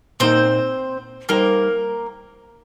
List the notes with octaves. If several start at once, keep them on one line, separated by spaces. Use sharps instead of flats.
A#2 A#3 C4 D#4 A#4 C5
G3 A#3 D#4 G4 A#4 C5